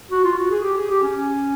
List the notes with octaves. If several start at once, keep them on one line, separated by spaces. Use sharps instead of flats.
F#4
F4
F#4
G#4
G4
G#4
G4
C#4